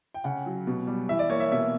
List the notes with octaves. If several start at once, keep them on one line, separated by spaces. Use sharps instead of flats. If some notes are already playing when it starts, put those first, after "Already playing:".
G5
C#3 F#5
F#3
B2
G3
E3 E5
D5
A#3 C#5
E5
B2 E5